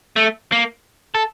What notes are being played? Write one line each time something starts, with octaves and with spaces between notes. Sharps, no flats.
A3
A#3
A4